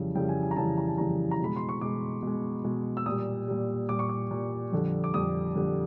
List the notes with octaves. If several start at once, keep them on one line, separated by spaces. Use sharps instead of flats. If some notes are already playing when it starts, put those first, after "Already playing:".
Already playing: F2 C#3 E3 G3
F2 C#3 E3 G3 G5
G#5
G#5
A#5
F2 C#3 E3 G3 A5
A#5
A5
F2 C#3 E3 G3 A#5
A#5
B2 G#3 B5
C6
C#6
B2 G#3 D6
B2 G#3
B2 G#3
E6
A#2 G3 D#6
A#2 G3
A#2 G3 D6
C#6
D6
A#2 G3
F2 D3 G3
D6
F2 D3 G3 D#6
F2 D3 G3